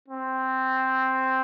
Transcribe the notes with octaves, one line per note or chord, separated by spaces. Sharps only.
C4